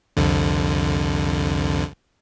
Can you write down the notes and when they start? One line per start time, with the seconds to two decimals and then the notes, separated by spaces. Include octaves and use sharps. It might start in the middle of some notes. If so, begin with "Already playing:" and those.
0.17 C2 F2 D3